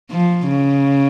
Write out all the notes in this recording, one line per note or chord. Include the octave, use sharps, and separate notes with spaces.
F3
C#3